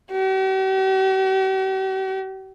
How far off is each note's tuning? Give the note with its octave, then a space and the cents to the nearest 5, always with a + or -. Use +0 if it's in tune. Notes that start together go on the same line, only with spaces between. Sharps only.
G4 -45